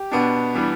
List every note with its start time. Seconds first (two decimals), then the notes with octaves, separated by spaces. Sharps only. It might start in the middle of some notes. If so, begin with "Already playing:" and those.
Already playing: G4
0.12 B2 B3 D4
0.54 E3 G3 B3 D4